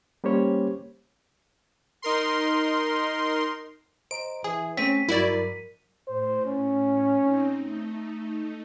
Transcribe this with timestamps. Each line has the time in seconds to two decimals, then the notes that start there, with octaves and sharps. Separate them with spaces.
0.24 G3 A#3 C#4 G4 C5 C#5
2.02 D#4 A#4 C6
4.11 C5 D#5 A#5 D7
4.44 E3 G#4 G#5
4.77 A3 C4 C#4 C#5 B6 D#7
5.09 G2 F#3 E4 F#4 A#4 D5
6.08 A2 C5
6.46 C#4
7.19 C4 D#4
7.58 A3 D#4